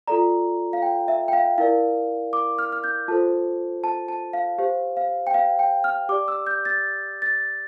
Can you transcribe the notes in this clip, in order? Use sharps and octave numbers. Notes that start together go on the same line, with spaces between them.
F4 A4 D5 A#5
F5
G5
E5
G5
F5
E4 A#4 D5 F5
D6
F6
F6
G6
F4 A4 C5 A5
A5
A5
F5
G4 C5 F5
F5
G5
F5
G5
F6
G4 D5 D6
E6
G6
A6
A6